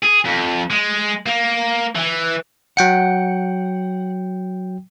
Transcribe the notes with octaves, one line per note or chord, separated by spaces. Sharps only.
G#4
F2
G#3
A#3
E3
F#3 F#5 G5 C#7